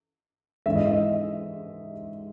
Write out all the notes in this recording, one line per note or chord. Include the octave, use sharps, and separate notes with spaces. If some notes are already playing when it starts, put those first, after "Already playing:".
G#2 E3 G#3 E5
D#5
E5